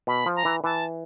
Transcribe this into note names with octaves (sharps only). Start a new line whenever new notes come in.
B2 B5
F3
A#5
E3
E3 A5